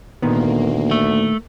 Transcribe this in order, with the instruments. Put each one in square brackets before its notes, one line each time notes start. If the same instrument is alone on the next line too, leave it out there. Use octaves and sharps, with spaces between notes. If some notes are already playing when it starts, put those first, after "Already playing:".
[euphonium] D2 [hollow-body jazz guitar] A#2 D#3 B3 [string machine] A#3
[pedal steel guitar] A3